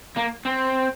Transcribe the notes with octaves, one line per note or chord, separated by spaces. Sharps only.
A#3
C4